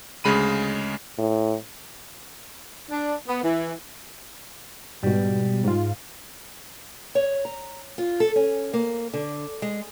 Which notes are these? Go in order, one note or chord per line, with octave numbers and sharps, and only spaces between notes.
D2 C#3 G#3 B5 D#7
A2
D4
B3
E3
G#2 B2 G3
G#2 F4
C#5
A#5
F4
A4
C#4
A#3
D3
G#3